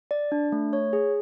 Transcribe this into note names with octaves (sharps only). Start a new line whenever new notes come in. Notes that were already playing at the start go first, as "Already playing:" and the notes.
D5
D4
A3
C#5
G#4